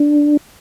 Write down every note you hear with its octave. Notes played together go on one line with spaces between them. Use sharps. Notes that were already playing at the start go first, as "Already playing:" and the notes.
Already playing: D4